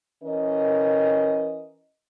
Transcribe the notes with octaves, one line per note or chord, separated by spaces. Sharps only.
E3 C#4 A#4 D#5